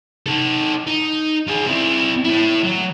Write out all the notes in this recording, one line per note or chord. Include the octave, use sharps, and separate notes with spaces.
D#4 A4
D#4
F4 G#4
C4 E4
A3 E4
F#3